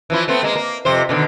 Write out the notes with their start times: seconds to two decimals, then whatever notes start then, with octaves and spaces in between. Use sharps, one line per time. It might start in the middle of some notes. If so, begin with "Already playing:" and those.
0.10 E3 F3 E4
0.28 A3 B3 C4
0.43 G#3 A#3
0.55 A#3
0.85 F2 C3 C5
1.09 B2 D3 D#3